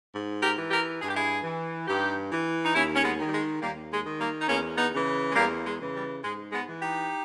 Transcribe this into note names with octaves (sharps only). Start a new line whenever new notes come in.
G#2
G4 A#4
E3
G4 A#4
G2 G#4
G4
E4 G#4
E3
G2 D#4 G4
E3
D#4
D#2 C#4 E4
C#4
G#3 B3
D#3
G3
G#3
D#2 G3 A#3
G#3
D#3
G3 A#3
D#4
E2 A#3 C#4
B3 D#4
C#3 E3
G#3
E2 G3 A#3
G#3
C#3 E3
G3
G#2 G#3
G#3 B3
E3
D#4 G4